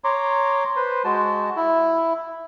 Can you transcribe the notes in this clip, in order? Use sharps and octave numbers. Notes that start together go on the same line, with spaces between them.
C#5 A#5 C6 D6
B4 C5 C6
G#3 F#4 A5
E4